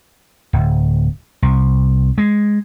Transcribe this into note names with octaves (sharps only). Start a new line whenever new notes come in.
D1
C2
G#3